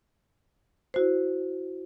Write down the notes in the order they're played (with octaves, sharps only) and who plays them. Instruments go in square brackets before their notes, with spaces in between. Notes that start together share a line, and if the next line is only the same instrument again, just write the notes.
[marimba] E4 F#4 C5